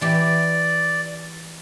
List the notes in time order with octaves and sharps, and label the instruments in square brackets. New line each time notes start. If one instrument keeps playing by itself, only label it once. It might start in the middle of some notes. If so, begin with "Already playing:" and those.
[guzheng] E3 G4 [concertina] D5